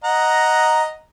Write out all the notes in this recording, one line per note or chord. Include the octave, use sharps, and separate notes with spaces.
D#5 F#5 A#5